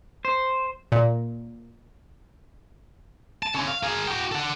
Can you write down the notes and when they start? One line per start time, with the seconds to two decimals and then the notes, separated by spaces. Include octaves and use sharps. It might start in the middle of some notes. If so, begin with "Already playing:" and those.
0.25 C5
0.92 A#2
3.43 A5
3.54 D3 C#4
3.68 F5
3.83 G#4 A#4
4.07 F#4 G5
4.32 A4 F#5